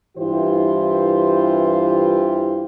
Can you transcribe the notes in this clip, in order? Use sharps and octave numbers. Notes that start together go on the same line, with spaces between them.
G2 E3 E4 F4 G4 C5